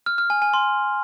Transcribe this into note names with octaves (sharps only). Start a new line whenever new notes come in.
F6
F6
G#5
G#5
C6